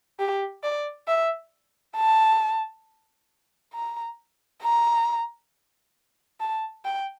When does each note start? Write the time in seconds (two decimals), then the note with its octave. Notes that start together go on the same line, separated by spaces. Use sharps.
0.19 G4
0.63 D5
1.08 E5
1.97 A5
3.74 A#5
4.63 A#5
6.41 A5
6.85 G5